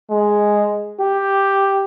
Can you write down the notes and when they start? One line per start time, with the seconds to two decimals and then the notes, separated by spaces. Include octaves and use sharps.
0.10 G#3
1.00 G4